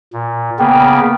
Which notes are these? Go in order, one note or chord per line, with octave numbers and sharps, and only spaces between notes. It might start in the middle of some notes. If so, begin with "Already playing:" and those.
A#2
C#3 A#3 B3 G5